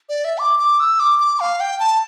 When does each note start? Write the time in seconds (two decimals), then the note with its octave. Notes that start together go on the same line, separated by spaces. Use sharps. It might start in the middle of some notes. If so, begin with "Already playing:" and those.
0.09 D5
0.25 E5
0.39 D6
0.59 D6
0.80 E6
1.00 D6
1.19 D6
1.40 F5
1.60 G5
1.80 A5